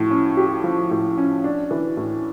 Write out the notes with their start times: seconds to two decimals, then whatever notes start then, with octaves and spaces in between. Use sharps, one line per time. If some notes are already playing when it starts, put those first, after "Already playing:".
Already playing: A2 F3
0.11 C#4
0.37 G4
0.64 F3
0.91 A2
1.18 C#4
1.44 D4
1.71 E3
1.97 A2